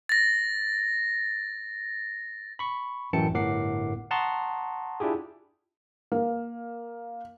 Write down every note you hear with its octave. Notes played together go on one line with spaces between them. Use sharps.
A6 A#6
B5 C#6
A1 F#2 E3 G5 A5 C#7
G1 A2 A#4 F#5 D6 C7
F#5 A5 A#5 C6 C#6 D#6
D4 E4 F4 G4 G#4
A#3